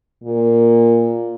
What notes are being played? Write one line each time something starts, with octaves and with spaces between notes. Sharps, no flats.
A#2